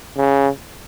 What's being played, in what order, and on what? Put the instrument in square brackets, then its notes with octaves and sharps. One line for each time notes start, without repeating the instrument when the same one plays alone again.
[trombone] C#3